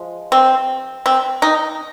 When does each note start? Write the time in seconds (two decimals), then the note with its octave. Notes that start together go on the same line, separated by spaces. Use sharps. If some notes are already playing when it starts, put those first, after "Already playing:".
Already playing: F3 G#3
0.32 C4
1.06 C4
1.42 D#4